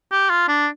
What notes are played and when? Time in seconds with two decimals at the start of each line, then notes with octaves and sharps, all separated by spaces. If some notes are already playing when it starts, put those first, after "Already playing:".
0.12 G4
0.30 F4
0.48 D4